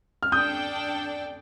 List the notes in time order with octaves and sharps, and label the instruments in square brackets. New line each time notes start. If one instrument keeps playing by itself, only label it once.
[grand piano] F6
[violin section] D4 A4 D5 G5 [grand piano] D#6 G6